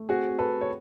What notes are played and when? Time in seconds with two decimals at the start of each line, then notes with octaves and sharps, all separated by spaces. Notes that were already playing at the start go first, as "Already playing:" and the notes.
Already playing: A3
0.09 C4 F#4 G#4
0.29 C4
0.39 A4 B4
0.49 C4
0.61 C#5